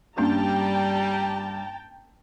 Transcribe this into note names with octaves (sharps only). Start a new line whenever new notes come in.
G2 G3 A#3 C#4 D4 G5 A5 A#5